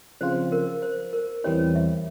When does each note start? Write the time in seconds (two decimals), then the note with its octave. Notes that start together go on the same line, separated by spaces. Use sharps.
0.21 C#3 F3 C4 F4 C5
0.52 A#4
0.82 C5
1.13 A#4
1.44 E2 E3 G3 C4 E4 C#5
1.76 E5